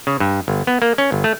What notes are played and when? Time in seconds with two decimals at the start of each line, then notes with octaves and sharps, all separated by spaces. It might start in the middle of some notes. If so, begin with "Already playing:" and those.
0.07 C#3
0.20 G2
0.48 G1
0.67 B3
0.82 A#3
0.98 C#4
1.12 G1
1.24 A3